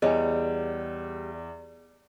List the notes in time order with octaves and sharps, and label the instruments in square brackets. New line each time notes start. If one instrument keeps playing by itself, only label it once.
[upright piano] E2 [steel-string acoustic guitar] G3 [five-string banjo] G#4 C#5 [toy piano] D#5 G#5